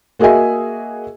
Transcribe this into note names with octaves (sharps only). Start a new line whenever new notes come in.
A#3 F#4 G#4 D#5 E5 G#5